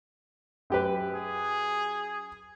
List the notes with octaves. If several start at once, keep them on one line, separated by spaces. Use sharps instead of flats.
F#2 G4 B4
G#4